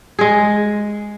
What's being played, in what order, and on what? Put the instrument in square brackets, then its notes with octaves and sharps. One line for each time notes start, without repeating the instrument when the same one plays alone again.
[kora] G#3 G#4